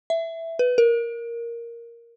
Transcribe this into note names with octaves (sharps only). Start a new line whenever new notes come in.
E5
B4
A#4